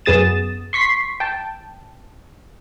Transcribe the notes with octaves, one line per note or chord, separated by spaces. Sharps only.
F#2 B3 G#4 D#6 A6 E7
C6 C#6 B6 C7
G5 A5